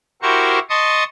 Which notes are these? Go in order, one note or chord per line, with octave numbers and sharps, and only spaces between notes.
E4 F#4 G4 A#4 C5 C#6
D#5 A5 C6 C#6 D#6